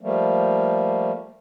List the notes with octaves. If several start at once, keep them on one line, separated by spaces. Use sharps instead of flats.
F3 G3 A3 A#3